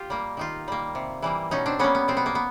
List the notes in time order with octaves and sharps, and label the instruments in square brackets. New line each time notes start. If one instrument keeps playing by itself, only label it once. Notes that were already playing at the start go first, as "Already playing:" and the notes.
Already playing: [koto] F4 G4
G3 A#3
D#3 D#4 F4
G3 A#3
C3
E3 G3 A#3
B2 C#4 D#4
C4 D4
G3 A#3 B3 C#4
B3
B2 C4
B3
A#3
B3